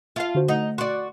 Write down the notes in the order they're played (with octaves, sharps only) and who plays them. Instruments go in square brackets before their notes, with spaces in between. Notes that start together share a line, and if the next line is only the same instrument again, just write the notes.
[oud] F4 F5 [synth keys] E5 A5
[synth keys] D3 F#4 C5
[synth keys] A3 F#5 [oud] D#4
[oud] F#4 D5 [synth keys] C6